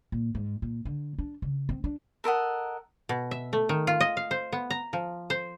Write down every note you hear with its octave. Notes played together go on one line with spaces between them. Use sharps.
A#2
G#2
A#2
D3
D4
C#3
C4
D4
A4 A#4 D#5 F#5
B2
E5
A3
D#3
F4
D#5
F5
C5
B3
A#5
F3
C5